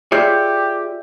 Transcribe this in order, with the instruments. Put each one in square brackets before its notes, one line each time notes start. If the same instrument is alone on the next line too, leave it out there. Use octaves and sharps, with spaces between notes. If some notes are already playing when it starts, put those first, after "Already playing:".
[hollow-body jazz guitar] F4 G#4 C#5 [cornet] G4 [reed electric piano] D5 E5 G6